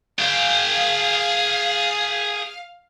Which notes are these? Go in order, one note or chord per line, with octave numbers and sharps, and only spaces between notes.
G#4 F5 G5